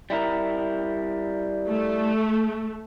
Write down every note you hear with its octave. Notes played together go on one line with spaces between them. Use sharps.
G3 E4 A#4
A3